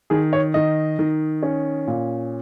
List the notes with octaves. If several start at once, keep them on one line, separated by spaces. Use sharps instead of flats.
D#3 G#4
C#5
D#3 D#5
D#3
C#4
A#2